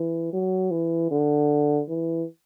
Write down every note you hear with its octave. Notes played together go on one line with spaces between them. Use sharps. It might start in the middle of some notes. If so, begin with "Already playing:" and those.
Already playing: E3
F#3
E3
D3
E3